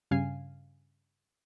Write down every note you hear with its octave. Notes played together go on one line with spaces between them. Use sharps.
G2 C#3 F5 G#5 C7